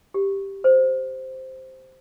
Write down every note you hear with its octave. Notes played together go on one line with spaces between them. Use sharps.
G4
C5